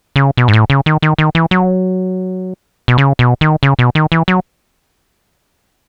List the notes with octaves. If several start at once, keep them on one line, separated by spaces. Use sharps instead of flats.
C#3
B2
G#2
A2
C#3
D#3
D#3
D#3
E3
F#3
B2
C#3
B2
D#3
C#3
B2
D#3
E3
F#3